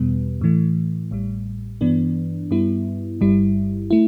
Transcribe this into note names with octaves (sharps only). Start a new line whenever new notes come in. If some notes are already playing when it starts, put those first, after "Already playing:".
Already playing: E2 B2 G3 B3
A2 E3 A3
A1 A2 G3
G2 E3 B3 D4
G2 G3 B3 E4
G1 G2 G3 E4
A3 E4